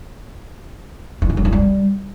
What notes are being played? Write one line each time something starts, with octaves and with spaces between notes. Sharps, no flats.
E3
D#3
F#3
E3
G3